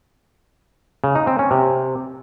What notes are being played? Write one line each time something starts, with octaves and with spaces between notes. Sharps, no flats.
C#3
D#4
C4
C#4
C3